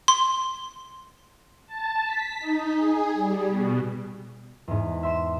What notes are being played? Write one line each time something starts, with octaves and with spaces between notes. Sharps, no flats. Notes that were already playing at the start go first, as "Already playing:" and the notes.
C6
A5
B6
D#4
G#4
G3
B2
E2 G#2
E5 C6 E7